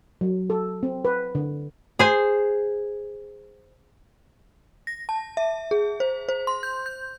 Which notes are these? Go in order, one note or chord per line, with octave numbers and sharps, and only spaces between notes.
F#3
A4
C4
B4
D3
G#4 C5 G#5
A#6
A5
E5
G#4
C5
C5
C6
G6
G6